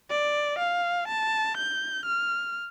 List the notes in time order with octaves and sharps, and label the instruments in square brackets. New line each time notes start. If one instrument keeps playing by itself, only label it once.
[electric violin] D5
F5
A5
G6
F6